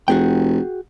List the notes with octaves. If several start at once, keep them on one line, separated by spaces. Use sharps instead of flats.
F1 F#4 G#4 G5